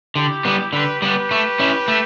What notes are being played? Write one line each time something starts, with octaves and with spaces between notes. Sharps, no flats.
D3 E4 G4
G3 B3
D3 G4 B4
G3 B3 G4 B4
A3
C#4 E4
A3